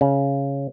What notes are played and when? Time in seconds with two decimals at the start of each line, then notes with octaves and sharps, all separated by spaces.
0.01 C#3